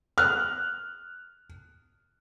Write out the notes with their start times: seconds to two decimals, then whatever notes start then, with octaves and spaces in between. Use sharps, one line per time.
0.18 F6 F#6